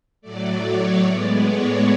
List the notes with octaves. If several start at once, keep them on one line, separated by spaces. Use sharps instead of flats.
A2 F#3 A3 D5
C#5
A2 G#3 B3 D5
C#5